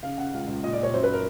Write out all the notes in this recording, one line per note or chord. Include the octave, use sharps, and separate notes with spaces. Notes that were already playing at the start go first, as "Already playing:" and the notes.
C#3 F5
C#3 F#5
C#2 F5
C#2
A#2 D#5
D5
A#2
C#5
F#2 C5
B4
A#4